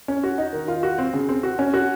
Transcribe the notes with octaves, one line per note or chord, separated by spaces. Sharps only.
C#4
F#4
D#4
D#3
F4
F#4
C4
C#3
C4
F#4
C#4
F#4